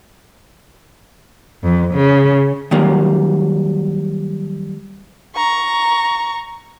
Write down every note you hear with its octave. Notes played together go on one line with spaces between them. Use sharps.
F2
C#3
D#3 F#3 G3 A#3
A#5 C#6